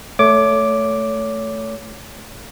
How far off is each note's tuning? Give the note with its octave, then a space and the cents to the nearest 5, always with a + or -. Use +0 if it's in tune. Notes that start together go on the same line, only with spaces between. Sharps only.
A3 +0 C#5 +25 D6 +0